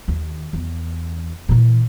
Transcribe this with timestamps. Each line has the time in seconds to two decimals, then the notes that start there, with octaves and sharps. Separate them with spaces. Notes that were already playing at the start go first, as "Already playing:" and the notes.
0.08 D#2
0.53 E2
1.49 A#2 E3